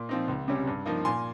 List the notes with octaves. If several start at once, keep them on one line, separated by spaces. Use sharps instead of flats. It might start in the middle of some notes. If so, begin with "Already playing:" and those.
Already playing: A#2
F3 C4 D#4
C#2
C3 G3 C#4
G2
F3 A#3 D#4
A#2 G#5 C6